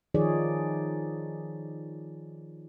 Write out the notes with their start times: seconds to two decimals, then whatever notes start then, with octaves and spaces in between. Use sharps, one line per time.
0.14 D#3 F3 D#4 G#4 C#5 D5